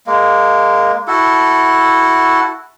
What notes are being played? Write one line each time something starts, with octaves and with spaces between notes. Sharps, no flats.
G#3 A#3
E4 F#4 A4